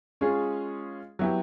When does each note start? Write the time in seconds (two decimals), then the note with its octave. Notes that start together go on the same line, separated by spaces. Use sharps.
0.21 G#3 C#4 F4 G#4
1.19 F#3 B3 E4 G4